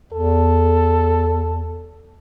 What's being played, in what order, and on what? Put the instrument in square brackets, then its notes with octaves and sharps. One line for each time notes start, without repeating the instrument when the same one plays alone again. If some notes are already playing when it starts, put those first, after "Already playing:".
[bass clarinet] E2 [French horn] A4